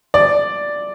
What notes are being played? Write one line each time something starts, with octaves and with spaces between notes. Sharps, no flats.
D5